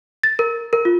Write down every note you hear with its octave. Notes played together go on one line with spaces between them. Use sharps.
A6
A#4
A#4
F4